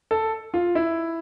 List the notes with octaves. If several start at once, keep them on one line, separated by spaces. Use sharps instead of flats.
A4
F4
E4